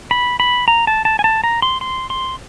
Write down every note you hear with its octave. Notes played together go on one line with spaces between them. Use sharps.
B5
B5
A#5
A5
A5
G#5
A5
A#5
C6
C6
C6